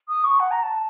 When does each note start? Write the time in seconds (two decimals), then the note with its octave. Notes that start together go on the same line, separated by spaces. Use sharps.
0.09 D#6
0.24 C#6
0.39 F#5
0.51 A#5
0.62 A5